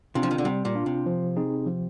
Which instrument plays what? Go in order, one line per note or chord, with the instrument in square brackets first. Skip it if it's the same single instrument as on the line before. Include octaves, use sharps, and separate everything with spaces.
[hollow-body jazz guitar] C3 [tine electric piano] D4 F4
[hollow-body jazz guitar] F3
D#3
D3
[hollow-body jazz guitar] C3 [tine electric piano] G3
[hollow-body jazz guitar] A#2
[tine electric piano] D4 F4
[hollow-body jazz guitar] C3
[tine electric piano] F3
C4 D#4 G#4
F3